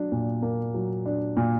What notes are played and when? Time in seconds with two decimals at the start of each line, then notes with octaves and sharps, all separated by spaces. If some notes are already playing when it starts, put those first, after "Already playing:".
Already playing: F#3 D4
0.12 A#2
0.42 A#3
0.74 F#3
1.06 D4
1.37 A#2